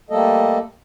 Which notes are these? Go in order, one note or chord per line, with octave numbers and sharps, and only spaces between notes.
G3 A3 A#3 A4 D#5